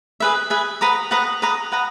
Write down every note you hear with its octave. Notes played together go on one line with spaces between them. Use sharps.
G#4 B4 E5
G#4 B4 E5
B4 F#5 A#5 D#6
B4 F#5 A#5 D#6
B4 F#5 A#5 D#6
B4 F#5 A#5 D#6